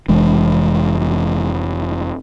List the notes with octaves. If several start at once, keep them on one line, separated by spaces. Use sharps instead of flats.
F1 E3 G#3 D4